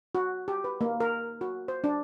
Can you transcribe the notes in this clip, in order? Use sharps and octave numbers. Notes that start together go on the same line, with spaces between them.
F#4
G4
B4
A#3
A#4
F#4
C5
D4